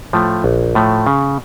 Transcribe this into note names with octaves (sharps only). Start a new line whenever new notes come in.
A2 F3 A3
A#1
A2 F3 A3
C#3